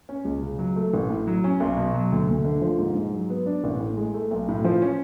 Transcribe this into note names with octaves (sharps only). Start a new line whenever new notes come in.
C#4
C#2
C#3
F#3
A3
A1
A2
F#3
C#4
B1
B2
F#3
D2
D2
D3
F3
G#2
G#2
F#3
B3
D4
A1
A2
G#3
A3
B1
A2
F3
C#4